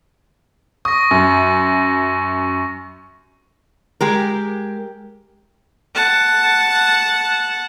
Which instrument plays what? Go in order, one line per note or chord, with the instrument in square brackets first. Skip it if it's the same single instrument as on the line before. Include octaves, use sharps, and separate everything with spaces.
[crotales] C#6 A#6 [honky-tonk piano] D#6
[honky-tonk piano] F#2
[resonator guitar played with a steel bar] G#3 G4 A#4
[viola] F#5 A5